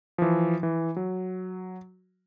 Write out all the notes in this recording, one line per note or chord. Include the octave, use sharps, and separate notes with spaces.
E3 F3
E3
F#3